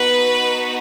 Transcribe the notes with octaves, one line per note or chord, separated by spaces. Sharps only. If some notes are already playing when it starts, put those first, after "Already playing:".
Already playing: B3 D#4 F#4 B4